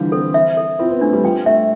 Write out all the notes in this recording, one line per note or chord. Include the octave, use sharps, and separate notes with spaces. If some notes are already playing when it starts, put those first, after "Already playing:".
Already playing: D3 E3 F3 G3
C4 A4
E5
A4
C4 F4
B3
A3 D4
G3
F3 G5
A3 E5